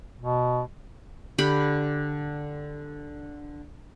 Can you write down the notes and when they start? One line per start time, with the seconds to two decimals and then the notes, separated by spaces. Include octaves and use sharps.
0.21 B2
1.38 D3 G4 G5 B5